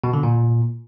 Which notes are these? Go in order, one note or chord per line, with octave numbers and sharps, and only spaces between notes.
B2
D3
A#2